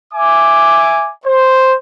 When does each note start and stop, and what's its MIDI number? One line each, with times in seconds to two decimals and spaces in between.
0.13 1.11 76
0.13 1.11 80
0.13 1.11 86
1.26 1.76 72